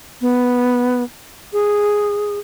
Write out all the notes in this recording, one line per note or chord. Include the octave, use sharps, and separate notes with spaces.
B3
G#4